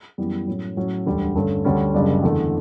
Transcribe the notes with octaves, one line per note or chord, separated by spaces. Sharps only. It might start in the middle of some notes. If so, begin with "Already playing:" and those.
F#2 E3 G3 B3
A2 F#3 C#4
A2 F#3 C#4
E1 D2 D3 G3
G2 D3 A3 C#4
D2 D3 G3 C#4
F#1 F#2 C#3 G3 D4
E2 D3 A3 D4